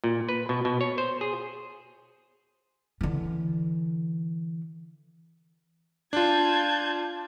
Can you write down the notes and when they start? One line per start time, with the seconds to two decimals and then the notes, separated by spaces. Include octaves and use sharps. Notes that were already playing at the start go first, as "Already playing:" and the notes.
0.04 A#2
0.29 B4
0.49 B2
0.65 B2
0.81 C#5
0.98 C5
1.21 G#4
3.01 D3 E3
6.13 D4 F4 A5 G6 G#6